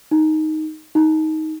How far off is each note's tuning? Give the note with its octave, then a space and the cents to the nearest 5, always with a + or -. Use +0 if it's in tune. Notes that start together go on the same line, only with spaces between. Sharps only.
D#4 +5
D#4 +15